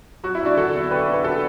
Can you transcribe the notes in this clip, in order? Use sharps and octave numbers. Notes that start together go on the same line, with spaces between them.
F#3 F#4
E4
F#3 D4 F#4
D3 F#4 A4
E2
D3 G4 B4
D3
B4
F#4 A4